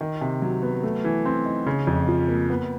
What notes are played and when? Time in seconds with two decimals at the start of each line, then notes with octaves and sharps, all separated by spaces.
0.01 D#3
0.21 C3
0.42 F#3
0.63 B3
0.83 A3
1.04 E3
1.26 C4
1.46 D#4
1.66 C#3
1.87 F2
2.08 F3
2.28 A#3
2.50 B3